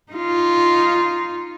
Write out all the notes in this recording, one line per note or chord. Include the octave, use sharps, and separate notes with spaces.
D#4 F4